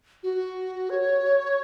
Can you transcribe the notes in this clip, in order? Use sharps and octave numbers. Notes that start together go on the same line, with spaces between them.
F#4
C#5